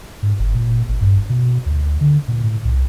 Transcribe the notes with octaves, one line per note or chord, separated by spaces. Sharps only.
G#2
G1
A#2
G#1
G2
B2
D2
D3
A#2
A2
C2